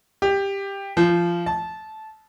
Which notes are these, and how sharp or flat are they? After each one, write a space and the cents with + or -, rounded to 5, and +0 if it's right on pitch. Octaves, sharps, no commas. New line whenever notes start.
G4 +10
F3 -20
A5 -15